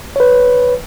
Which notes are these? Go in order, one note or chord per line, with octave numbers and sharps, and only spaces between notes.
B4 C#5